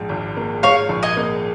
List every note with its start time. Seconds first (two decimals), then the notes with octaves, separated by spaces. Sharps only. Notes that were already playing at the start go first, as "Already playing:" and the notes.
Already playing: A#1 G#2
0.09 G#1
0.37 A#3
0.63 G#2 C#5 F5
0.89 A#1
1.03 D#5 G#5
1.17 A#3